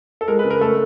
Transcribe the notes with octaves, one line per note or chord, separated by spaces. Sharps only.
A4
G#3 A#4
B4
C#3
A#4
A3 A4